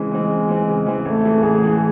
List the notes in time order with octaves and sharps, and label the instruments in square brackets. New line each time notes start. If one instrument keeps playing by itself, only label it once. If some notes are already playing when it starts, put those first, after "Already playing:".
Already playing: [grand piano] C#3 E3 C4 [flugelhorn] G#3
[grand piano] E3 C4
C#3
E3 C4
C#3
E3 C4
[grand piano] A1 [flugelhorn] A3
[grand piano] A2 E3 G#3
[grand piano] A1 [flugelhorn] G#4
[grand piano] A2 E3 G#3